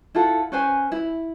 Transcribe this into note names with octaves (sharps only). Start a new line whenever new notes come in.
E4 F4 A4 F#5
C#4 B4 C5 G#5
E4